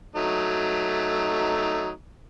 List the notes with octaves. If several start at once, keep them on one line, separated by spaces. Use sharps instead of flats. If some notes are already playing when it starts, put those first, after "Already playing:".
F#3 A3 D#4